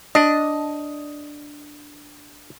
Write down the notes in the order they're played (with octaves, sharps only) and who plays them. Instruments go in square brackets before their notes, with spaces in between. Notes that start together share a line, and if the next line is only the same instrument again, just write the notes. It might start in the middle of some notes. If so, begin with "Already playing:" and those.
[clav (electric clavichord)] D4 [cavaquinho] D#5